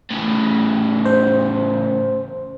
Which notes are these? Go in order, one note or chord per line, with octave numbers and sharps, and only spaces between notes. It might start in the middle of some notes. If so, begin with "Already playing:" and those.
A2 C#3
C5